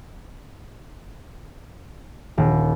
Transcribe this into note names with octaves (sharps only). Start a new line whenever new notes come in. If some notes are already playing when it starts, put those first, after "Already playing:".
D#1